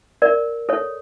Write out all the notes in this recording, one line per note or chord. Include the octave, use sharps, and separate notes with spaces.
A#4 D5
A4 C#5